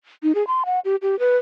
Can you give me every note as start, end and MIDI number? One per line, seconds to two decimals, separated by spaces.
0.23 0.35 63
0.35 0.46 68
0.47 0.63 84
0.66 0.80 78
0.85 0.96 67
1.02 1.19 67
1.19 1.37 71